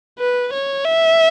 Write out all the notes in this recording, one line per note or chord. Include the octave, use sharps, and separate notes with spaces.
B4
C#5
E5